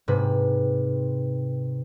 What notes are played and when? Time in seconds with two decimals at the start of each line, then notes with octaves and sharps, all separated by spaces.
0.08 G#2 C3 B4